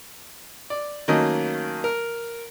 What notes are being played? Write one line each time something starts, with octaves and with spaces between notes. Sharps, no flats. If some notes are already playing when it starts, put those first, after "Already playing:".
D5
D#3 F#3 A3 A#3 C#4 D#5
A#4